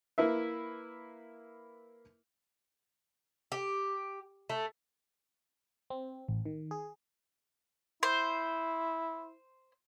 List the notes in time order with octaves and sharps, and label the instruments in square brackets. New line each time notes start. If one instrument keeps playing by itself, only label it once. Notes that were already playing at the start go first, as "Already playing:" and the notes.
[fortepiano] A#3 E4 B4 E5
[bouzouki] G4
A3
[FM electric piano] C4
A1
D#3
G#4
[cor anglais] E4 [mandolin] C5